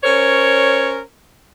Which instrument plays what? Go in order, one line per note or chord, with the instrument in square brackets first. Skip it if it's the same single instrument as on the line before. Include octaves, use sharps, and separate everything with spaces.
[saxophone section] C#4 A#4 C5 C#5